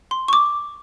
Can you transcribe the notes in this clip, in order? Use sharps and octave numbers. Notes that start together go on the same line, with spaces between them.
C6
C#6
D6